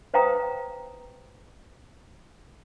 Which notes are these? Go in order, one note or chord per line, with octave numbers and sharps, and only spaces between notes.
B4 C5 F5 G5 A#5 D#6